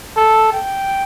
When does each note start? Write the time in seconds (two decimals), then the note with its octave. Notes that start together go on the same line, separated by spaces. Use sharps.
0.17 A4
0.53 G5